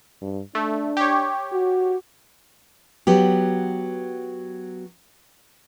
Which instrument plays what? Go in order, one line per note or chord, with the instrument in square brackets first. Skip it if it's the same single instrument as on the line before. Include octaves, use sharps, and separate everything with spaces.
[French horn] G2
[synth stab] A3 [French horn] D4
[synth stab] G4 C#5
[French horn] F#4
[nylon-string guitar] F#3 B3 G4